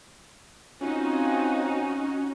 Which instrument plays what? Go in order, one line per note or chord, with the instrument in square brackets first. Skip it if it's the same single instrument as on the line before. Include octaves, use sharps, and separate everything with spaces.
[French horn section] C4 F4 [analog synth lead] C#4 [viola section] D#4 F#4 [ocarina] G#5